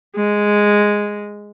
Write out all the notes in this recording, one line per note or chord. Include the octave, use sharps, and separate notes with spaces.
G#3